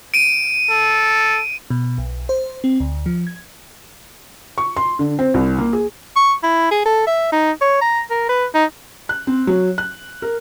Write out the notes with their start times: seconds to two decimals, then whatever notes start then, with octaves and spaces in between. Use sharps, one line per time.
0.14 D7 D#7
0.71 A4
1.70 B2
1.98 B1
2.29 C5
2.64 C4
2.80 D2
3.06 F3
3.27 G#6
4.58 C#6
4.77 C6
4.99 D3
5.19 C4
5.34 C2
5.58 A#3
5.73 G#4
6.16 C#6
6.43 E4
6.71 G#4
6.86 A4
7.07 E5
7.33 D#4
7.61 C#5
7.82 A#5
8.11 A#4
8.29 B4
8.55 D#4
9.09 F#6
9.27 C4
9.47 F#3
9.78 F#6
10.22 A#4